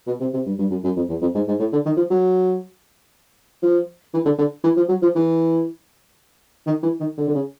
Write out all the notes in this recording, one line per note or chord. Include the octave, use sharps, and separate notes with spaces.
B2
C3
C3
G2
G2
F#2
F#2
F2
E2
F2
G#2
G#2
A2
D3
D#3
F3
F#3
F3
E3
D3
D3
E3
F3
F#3
F3
E3
D#3
E3
D#3
D3
D3
C#3